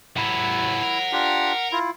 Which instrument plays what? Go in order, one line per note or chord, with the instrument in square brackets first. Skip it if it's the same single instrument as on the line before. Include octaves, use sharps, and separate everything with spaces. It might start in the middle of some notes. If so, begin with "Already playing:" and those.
[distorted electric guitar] A2 B3 [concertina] E4 [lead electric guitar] F#5 A#5
[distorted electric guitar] A#4
[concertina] D4 F4 G4
E4 F4